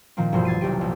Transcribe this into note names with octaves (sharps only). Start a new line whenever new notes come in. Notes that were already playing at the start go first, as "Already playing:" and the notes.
A#2 D#3 F3 A#3 C4
E1 A#1 G2 B2 F3 C5
G#6 A6 C7 D#7
F1 B1 C3 G4 D#7
A#1